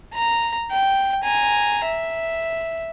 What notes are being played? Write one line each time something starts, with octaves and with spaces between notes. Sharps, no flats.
A#5
G5
G#5 A#5
E5